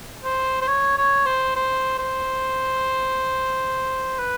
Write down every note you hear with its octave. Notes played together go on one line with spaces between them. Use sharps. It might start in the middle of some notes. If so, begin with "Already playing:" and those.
C5
C5
C#5
C#5
C5
C5
C5
B4